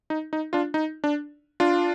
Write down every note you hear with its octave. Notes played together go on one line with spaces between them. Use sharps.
D#4
D#4
D4 F4
D#4
D4
D4 F4